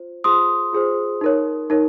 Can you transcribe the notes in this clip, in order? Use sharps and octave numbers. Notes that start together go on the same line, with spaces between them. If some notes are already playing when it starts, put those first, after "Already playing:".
Already playing: F4 C5
F4 G#4 C5 C6 D#6
F4 G#4 C5
D#4 A#4 C#5
D#4 A#4 C#5